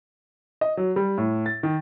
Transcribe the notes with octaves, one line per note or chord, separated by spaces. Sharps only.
D#5
F#3
G3
A2
A6
D#3